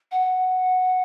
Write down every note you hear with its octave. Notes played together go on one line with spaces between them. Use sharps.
F#5